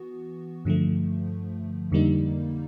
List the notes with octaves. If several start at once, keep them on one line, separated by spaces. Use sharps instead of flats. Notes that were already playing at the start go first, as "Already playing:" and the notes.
Already playing: E3 B3 F#4
G2 D3 F3 A3
F2 D3 G3 A#3 D#4